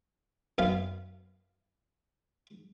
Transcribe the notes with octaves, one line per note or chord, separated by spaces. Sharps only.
F#2 B3 F5